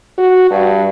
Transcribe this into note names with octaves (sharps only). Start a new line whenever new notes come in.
F#4
G2